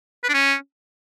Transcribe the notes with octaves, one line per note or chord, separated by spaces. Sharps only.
B4
D4
C#4